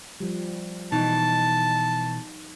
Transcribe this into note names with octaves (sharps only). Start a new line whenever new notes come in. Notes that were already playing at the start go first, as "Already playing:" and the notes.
F3 G3
B2 E3 D#4 A5